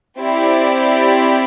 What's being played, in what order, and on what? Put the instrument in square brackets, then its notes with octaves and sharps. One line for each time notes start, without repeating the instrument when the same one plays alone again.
[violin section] C4 E4 G4 D5